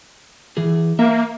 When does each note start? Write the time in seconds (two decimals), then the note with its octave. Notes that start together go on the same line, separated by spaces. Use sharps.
0.57 E3 G#4
0.99 A#3 E5